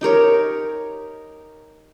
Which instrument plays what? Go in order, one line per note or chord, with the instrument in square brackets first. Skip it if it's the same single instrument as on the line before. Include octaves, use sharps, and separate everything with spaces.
[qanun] D#4 G4 A#4 C#5